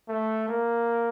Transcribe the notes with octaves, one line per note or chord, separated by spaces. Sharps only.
A3
A#3